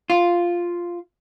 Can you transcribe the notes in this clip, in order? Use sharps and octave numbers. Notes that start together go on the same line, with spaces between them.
F4